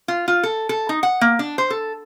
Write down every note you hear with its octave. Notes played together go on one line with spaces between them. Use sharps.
F4
F4
A4
A4
D#4
F#5
A#3
D4
C5
A4